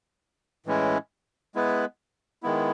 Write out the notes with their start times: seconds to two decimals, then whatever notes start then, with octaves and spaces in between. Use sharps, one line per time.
0.66 A2 E3 G#3 C#4 E4
1.55 G#3 B3 E4 B4
2.43 D#3 G#3 B3 E4